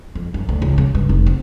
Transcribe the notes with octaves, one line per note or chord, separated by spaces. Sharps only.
F2
F#2
D2
C#2
C#3
G2
F1
C4